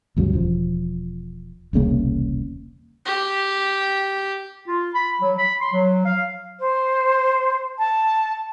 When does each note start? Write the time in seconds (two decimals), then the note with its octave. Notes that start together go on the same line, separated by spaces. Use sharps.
0.17 D2 G2 C#3 F#3
0.33 E1 F3
1.73 E1 C2 C#3 A#3
3.05 G4
4.68 F4
4.94 B5
5.22 F#3
5.39 B5
5.61 C6
5.73 F#3
6.06 F5
6.59 C5
7.78 A5